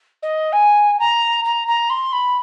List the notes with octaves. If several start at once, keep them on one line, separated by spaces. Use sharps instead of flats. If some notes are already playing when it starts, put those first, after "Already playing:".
D#5
G#5
A#5
A#5
A#5
C6
B5